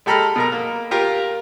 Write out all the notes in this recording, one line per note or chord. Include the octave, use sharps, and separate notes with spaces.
G#3 G4 A4 A#5 B5 F6
B2 A#4 A#5
A#3
F4 G4 A#4